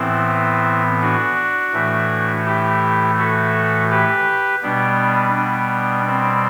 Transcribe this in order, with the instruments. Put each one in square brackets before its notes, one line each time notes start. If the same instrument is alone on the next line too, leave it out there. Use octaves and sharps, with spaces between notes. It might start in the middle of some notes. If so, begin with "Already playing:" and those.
Already playing: [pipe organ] A2 E3 B3 C4 E4
D4 F#4
A2 E3 A3
E4 G4
F#4 A4
G4 B4
B2 G3 B3 D4
B3 D4
C4